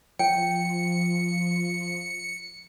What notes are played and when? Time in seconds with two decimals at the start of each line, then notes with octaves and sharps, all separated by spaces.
0.19 F3 G5 C#7